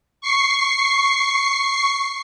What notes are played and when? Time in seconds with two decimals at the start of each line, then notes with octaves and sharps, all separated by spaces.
0.21 C#6 C7